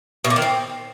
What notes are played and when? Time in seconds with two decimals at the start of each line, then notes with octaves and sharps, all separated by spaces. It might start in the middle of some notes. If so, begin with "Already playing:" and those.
0.24 B2
0.30 A#2
0.36 D#3
0.42 C4